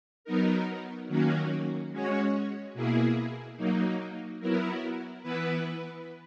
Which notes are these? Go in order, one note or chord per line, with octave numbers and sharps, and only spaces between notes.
F#3 B3 D#4 A#4
D#3 F#3 A#3 C#4 F#4
G#3 C#4 F#4 C#5
B2 A#3 E4 G#4
F#3 A#3 D#4
F#3 B3 E4 A#4
E3 B3 E4 B4